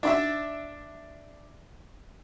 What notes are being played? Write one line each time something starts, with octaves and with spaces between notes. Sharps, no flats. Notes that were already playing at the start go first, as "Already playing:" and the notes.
D4 D5 E5